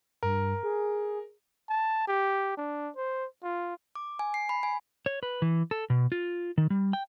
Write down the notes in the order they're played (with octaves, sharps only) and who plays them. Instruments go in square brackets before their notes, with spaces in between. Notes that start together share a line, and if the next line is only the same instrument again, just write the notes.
[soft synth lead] G2 [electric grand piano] A#4
[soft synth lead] G#4
[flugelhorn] A5
G4
D4
C5
F4
[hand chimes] D6
G#5
C7
B5
G#5
[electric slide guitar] C#5
B4
E3
A4
B2
F4
D#3
G3
G5